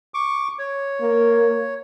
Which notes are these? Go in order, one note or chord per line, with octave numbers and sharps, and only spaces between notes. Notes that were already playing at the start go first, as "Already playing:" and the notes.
C#6 D6
C#5
A#3